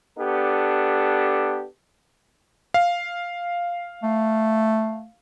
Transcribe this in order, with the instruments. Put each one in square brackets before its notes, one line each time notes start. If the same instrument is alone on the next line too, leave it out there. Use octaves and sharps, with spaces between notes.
[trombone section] B3 D4 G4 A4
[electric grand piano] F5
[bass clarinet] A3